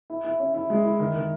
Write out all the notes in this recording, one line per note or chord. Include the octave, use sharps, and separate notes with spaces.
E4
E4
C#4
E4
G#3
E4
D#3
D#3